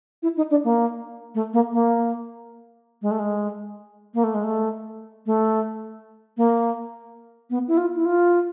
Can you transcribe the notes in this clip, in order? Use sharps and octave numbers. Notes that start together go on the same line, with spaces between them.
E4
D#4
D4
A#3
A3
A#3
A#3
G#3
A3
G#3
A#3
A3
G#3
A3
A3
A#3
B3
E4
F4
E4
F4